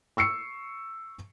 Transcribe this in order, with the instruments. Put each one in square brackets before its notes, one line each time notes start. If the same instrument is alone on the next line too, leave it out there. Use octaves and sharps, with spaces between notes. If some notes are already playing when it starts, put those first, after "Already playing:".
[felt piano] C#6 E6 C7 C#7